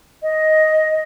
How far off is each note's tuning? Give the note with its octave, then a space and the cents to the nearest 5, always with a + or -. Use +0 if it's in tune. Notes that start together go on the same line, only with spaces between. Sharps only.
D#5 +5